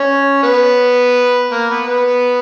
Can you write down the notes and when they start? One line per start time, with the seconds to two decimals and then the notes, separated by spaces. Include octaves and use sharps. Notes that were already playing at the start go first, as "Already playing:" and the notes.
Already playing: C#4 C#5
0.43 B3 B4
1.51 A#3 A#4
1.69 B3 B4
1.87 B3 B4